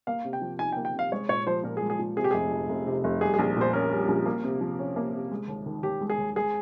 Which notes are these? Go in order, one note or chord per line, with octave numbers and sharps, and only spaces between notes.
A#3 F5
C3
G5
F3
D#4 G#5
G5
A#3
G5
C3 F5
G#3 C#5
A#2 C#5
F3 C5
A#2 A#4
G#4
G#3
G#4
A#2
C3 G#4
G4
F1 G#4
F2
F1
C3
F1
G3 G#4
G#4
A#1
A#2 C5
C#4 A#4
G3
A#1
A#3
C3
F3
C#4
A#3
C3
G#3
D#2
D#3
D#2 G4
G#3
G#4
D#2
G#3 G#4